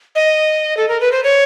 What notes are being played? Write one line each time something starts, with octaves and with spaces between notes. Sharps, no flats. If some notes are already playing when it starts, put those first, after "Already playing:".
D#5
A4
A#4
B4
C5
C#5